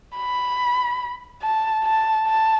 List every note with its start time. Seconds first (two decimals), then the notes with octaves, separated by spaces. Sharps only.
0.17 B5
1.42 A5
1.84 A5
2.27 A5